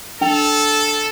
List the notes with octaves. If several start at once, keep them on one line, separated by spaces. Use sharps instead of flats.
D4 A4 G5 F7